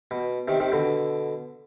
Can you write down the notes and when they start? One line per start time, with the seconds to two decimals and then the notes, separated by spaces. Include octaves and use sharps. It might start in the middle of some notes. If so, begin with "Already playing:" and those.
0.11 B2
0.48 C3 D#3
0.60 C3 D#3
0.72 B2 D3